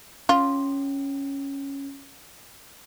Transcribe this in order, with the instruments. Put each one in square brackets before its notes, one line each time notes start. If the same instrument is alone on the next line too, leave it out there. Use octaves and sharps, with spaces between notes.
[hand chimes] C#4 [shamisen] F4